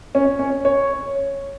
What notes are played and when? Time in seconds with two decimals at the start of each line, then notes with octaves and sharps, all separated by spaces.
0.15 C#4
0.39 C#4
0.65 C#5